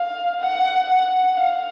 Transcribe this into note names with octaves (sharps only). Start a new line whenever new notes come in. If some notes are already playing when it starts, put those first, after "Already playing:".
Already playing: F5
F#5
F#5
F5